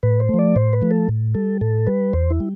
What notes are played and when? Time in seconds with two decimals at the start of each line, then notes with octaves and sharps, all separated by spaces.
0.03 A2 B4
0.20 C5
0.29 F3 A3
0.39 D5
0.56 A2 C5
0.73 B4
0.82 F3 A3
0.91 A4
1.09 A2
1.34 G3 A4
1.61 A2 A4
1.87 G3 B4
2.13 E2 C5
2.30 E4
2.40 G3